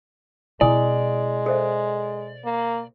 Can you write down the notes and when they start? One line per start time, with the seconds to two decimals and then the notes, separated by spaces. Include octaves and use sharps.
0.61 B2 G#3 C4 E4 D5 G#5 D#6
1.46 A4 C5 E5
2.45 A#3